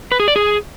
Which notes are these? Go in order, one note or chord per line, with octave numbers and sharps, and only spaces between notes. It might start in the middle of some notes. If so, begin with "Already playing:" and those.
B4
G#4
D5
G#4